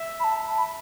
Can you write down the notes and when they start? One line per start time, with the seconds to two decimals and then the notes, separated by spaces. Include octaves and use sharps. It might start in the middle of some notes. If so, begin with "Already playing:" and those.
Already playing: E5
0.20 B5
0.24 A5
0.58 B5